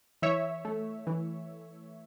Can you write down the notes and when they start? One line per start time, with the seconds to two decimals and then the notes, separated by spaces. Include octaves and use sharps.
0.22 E3 C#5 E5
0.65 A3
1.07 E3